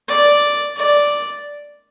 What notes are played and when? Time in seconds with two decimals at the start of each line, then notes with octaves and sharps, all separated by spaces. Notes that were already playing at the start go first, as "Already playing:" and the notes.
0.08 D5
0.76 D5